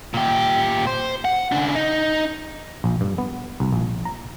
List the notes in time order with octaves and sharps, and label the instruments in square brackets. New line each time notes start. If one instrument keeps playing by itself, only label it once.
[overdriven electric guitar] A#2 G4
C5
F#5
C#3 D4
D#4
[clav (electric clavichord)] A#1
G2
B3
C2
A#1
A#5